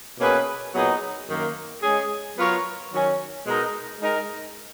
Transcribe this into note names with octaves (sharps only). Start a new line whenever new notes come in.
B2 A#3 C#4 G#4 B4
A#2 F#3 B3 D#4 G#4
F#2 D#3 A#3
G#3 C#4 G#4
F#3 B3 F4 A#4 C#5
D#3 F#3 C#4
B2 G#3 D#4 A#4
G#3 D#4 A#4